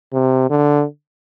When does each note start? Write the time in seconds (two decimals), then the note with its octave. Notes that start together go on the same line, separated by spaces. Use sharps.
0.13 C3
0.50 D3